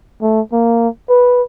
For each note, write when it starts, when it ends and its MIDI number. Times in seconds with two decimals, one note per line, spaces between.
0.22 0.41 57
0.52 0.88 58
1.10 1.42 71